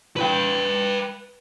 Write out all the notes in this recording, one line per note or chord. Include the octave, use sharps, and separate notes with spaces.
B4 G5